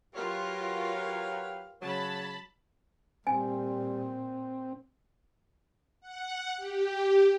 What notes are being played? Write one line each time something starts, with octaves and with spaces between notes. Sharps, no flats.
F#3 F4 G4 A#4 B4 C#5 F5
C#3 F#3 C#5 A5 B5
A#2 G3 C4 G#5
F#5
G4